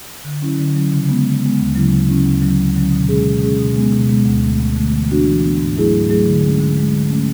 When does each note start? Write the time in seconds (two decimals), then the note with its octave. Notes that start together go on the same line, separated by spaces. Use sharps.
0.24 D3
0.41 F#3 C#4 E4
0.58 D3
0.75 F#3 C#4 E4
0.91 C#3
1.09 G#3 B3
1.25 C#3
1.41 G#3 B3
1.59 D2
1.75 C#3 F#3 C#4 E4
1.92 D2
2.08 C#3 F#3 C#4 E4
2.25 D2
2.41 D3 F#3 C#4
2.59 D2
2.75 D3 F#3 C#4
2.92 B2
3.09 G#3 C#4 G#4
3.26 B2
3.42 G#3 C#4 G#4
3.58 B2
3.76 G#3 B3
3.93 B2
4.09 G#3 B3
4.26 D2
4.43 D3 A3
4.60 D2
4.76 D3 A3
4.93 E3
5.10 B3 D4 F#4
5.26 E3
5.43 B3 D4 F#4
5.59 G#2
5.77 F#3 A3 E4 G#4
5.93 G#2
6.09 F#3 A3 E4 G#4
6.26 D3
6.43 G#3 C#4
6.60 D3
6.77 G#3 C#4
6.93 D3
7.10 A3 C#4